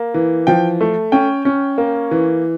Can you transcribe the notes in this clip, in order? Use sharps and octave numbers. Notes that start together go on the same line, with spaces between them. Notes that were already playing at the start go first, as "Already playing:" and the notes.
Already playing: A#3
E3
F3 G5
A3
C#4 G5
C#4
A#3
E3